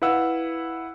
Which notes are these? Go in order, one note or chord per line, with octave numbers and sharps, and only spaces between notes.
E4 B4 F5 F#5 E6